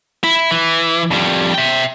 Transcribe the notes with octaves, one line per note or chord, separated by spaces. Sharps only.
E4
E3
F2 G3
E5 G5